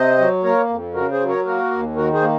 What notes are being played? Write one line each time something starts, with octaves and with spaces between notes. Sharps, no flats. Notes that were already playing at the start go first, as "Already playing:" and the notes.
Already playing: C3 C5 D#5
F#3
A#3 A#4 C#5
F2
C#3 F#4 A#4
G#4 C5
F#3
A#4 C#5
A#3 F#4 A#4
D#2
D#3 F#4 A#4
G#4 C5
A#3